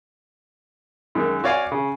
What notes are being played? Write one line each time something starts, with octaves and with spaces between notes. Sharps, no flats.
F#2 D#3 G#3
F#4 C#5 D5 F5 G#5
C#3